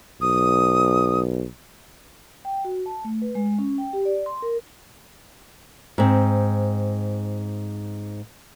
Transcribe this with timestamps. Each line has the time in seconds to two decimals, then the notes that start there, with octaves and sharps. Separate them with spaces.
0.21 B1 D#6
2.45 G5
2.65 F#4
2.86 A5
3.05 A3
3.22 B4
3.35 G#3
3.59 C#4
3.78 G5
3.93 G4
4.05 D5
4.26 C6
4.42 A#4
5.98 G#2 C4